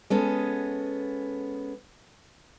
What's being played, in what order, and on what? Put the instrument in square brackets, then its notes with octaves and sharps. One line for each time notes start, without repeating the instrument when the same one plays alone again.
[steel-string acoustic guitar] G#3 B3 C#4 A4